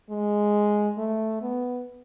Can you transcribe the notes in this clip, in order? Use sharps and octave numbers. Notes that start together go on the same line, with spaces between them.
G#3
A3
B3